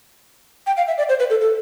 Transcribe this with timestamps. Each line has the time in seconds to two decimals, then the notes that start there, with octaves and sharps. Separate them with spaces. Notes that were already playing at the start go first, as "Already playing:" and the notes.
0.67 G5
0.77 F5
0.88 E5
0.98 D5
1.09 C5
1.19 B4
1.30 A4
1.41 A4